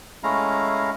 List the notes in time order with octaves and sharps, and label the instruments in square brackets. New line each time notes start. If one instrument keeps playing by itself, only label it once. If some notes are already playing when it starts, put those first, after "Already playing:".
[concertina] G#3 A3 C#4 E4 F5 A#5